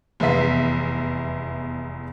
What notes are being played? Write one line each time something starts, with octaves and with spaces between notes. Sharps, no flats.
F1 E2 B3 E5 B6